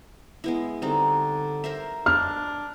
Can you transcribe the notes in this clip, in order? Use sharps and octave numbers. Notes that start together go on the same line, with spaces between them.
G#3 B3 E4
D3 G3 C4 D#4
A#4 C5 E5
D4 F6